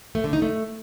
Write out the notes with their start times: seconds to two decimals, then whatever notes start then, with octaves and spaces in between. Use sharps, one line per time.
0.15 A3
0.24 D3
0.33 D#4
0.42 A3